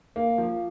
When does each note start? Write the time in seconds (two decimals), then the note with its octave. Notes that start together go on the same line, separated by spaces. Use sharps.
0.16 A#3
0.38 F3